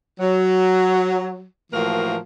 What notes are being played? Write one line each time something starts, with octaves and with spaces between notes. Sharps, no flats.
F#3
A2 E3 F3 A#3 F#4 A#4